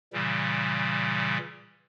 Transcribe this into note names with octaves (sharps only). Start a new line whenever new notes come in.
A#2 C#3 E3 G3